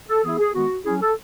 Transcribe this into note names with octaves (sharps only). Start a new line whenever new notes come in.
A4
E3 B3 E4 G#4
G#4
D#3 G#3 B3 F#4
F#3 C#4 E4 G#4
A4